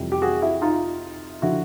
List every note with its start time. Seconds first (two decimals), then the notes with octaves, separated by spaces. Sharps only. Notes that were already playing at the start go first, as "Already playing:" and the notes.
Already playing: F2 C3 E3 G3
0.12 G4
0.22 F#4 G#4
0.42 E4 F#4
0.62 D#4 F4
1.42 D3 F3 E4 F#4